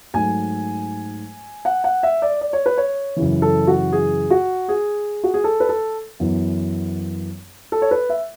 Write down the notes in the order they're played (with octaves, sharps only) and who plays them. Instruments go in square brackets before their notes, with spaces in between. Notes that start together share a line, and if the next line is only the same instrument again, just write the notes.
[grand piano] G#2 F#3 A3 G#5
F#5
F#5
E5
D5
D5
C#5
B4
C#5
F#2 C#3 E3
A4
F#4
G#4
F#4
G#4
F#4
G#4
A4
B4
A4
F#2 E3 B3
A4
C#5
B4
E5